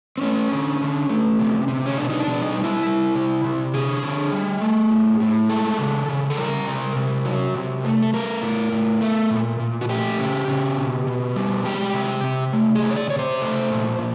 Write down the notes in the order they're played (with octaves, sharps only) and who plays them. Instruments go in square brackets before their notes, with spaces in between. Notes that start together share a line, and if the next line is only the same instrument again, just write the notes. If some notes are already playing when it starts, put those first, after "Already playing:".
[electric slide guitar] C4
A3 C#4
D3
D3
A3
C3
C3
C#4
B2 D4
D#4
D4
B2
D#4
G3
E4
G3
C3
C3
D3 G#4
D3
G3
A3
A2
A2
G#3 A4
C#3
C#3
A4
G3 A#4
C3
C3
F#3
C3
A3
A4
A3 A#4
A2
A2
A3
A#2
A#2
F#4
A3 G4
C#3
C#3
B2
B2
G3
G#3 G4
C3
C3
A3
G#4
C3
C#5
D5
C3 C#5
C5
A3
A#2
A#2